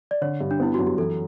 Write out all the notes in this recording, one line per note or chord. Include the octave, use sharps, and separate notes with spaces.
D5
D3 C#5
G2
D4
B3 E4
F#2 F#4
G4
E3 A4